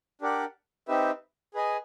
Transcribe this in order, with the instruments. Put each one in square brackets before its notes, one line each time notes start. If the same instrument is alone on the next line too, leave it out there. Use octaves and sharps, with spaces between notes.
[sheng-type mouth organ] D4 G4 A#4 D5 F#5
C4 D#4 G4 B4 E5
G#4 B4 D#5 G#5